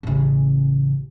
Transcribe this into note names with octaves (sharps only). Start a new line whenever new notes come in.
A1 C#3